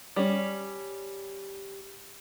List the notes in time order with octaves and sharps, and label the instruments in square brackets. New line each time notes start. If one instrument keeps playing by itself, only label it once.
[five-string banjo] G3 C#4